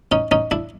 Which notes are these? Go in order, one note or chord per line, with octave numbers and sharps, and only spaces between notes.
C#4 D#4
C#4 D#4
D4 E4